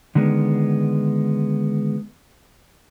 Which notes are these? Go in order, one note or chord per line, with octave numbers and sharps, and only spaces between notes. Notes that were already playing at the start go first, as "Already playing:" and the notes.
D3 D#3 G#3 B3